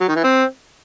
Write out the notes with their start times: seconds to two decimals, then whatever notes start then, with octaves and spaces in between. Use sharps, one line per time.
0.01 F#3
0.08 D#3
0.16 E3
0.24 C4